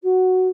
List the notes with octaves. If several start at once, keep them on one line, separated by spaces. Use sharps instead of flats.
F#4